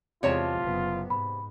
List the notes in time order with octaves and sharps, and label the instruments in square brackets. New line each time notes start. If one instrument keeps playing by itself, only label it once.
[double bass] E2 G#3 [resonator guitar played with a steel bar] C3 C#5 A5 [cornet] F4
[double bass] F#1 B3
[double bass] G#2 [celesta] B5